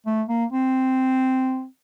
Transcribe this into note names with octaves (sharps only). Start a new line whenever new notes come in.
A3
A#3
C4